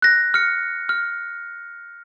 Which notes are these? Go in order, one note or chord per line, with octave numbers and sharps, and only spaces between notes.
F#6 A#6
F6 C#7
F6